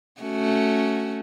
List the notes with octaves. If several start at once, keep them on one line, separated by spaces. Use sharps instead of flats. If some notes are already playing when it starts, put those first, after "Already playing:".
A3 C#4 F#4